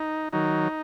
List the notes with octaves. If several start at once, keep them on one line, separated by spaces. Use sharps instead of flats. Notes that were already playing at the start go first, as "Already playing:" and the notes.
Already playing: D#4
D#3 F#3 D#4